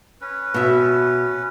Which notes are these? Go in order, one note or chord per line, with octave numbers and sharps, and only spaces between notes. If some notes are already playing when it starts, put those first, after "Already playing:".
C#4 B4
B2 E5